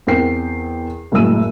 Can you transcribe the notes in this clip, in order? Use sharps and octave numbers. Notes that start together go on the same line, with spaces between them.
E2 C4 A#4 G5 C7
F#1 F#2 A2 G#3 E6 D#7